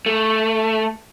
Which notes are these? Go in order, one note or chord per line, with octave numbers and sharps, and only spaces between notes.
A3